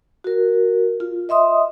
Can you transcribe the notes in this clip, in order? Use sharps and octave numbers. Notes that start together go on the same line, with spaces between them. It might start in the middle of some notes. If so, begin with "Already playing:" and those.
F#4 A#4
F4
D#5 E5 C6 D#6